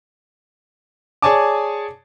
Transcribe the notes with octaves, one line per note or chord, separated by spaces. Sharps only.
G#4 C#5 D5 G#5 A5 D6